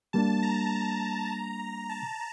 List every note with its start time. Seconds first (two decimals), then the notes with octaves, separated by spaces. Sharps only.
0.13 G3 A#3 D4 A5
0.43 A#5
0.72 A#5
1.89 A5